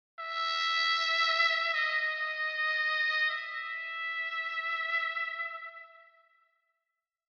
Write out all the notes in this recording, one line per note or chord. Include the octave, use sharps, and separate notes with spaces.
E5
D#5
E5